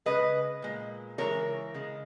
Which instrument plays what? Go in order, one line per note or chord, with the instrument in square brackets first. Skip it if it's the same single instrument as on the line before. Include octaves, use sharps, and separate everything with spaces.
[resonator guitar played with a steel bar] C#3 G#3 B4 D#5
A#2 G#3
C#3 E3 G#3 A#4 C#5
C#3 G#3